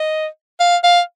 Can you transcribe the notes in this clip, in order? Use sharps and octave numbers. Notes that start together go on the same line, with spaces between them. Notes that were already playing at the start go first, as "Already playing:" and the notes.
Already playing: D#5
F5
F5